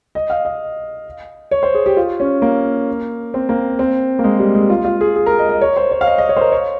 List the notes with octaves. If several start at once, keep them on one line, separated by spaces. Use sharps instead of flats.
D#5
F5
D#5
C#5
C5
G#4
G4
F4
C#4
A#3
C4
A#3
C4
A#3
G#3
G3
G#3
F4
F4
G#4
G#4
A#4
D#5
D#5
C#5
C5
C#5
F5
D#5
D#5
C#5
C5
A#4
C#5